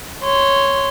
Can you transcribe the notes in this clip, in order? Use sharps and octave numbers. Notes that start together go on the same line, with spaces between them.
C#5 C6